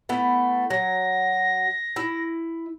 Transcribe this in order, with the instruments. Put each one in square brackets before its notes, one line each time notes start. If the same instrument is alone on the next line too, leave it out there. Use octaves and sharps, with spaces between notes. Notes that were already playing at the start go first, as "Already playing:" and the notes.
[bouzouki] A3 B3 E4
[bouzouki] F#3 [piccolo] A#6
[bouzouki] E4